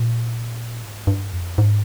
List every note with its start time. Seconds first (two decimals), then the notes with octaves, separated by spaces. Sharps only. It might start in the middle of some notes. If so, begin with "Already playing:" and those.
Already playing: A#2
0.82 G#2
1.07 G2
1.33 F2
1.58 G#2